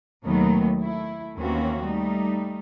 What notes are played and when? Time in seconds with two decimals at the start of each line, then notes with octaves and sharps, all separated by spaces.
0.24 D#2 B2 D#3 F#3 A3 B3
0.78 A3 E4
1.37 D#2 E3 A#3 C4 C#4 F#4
1.83 G3 A3 D#4